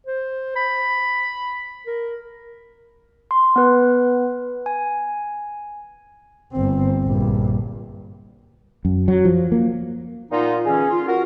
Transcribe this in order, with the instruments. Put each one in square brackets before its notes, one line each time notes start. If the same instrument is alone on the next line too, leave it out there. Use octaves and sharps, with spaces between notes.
[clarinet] C5
B5
A#4
[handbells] C6
B3 B4
G#5
[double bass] G1 C4
A#1 G2
[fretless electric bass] F#2
F#3
F3
A#3
[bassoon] A#2 [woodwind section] B3 D#4 F4
[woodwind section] D3 E3 C#4 [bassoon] G#4
[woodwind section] F4
[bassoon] F#4 [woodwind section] A#4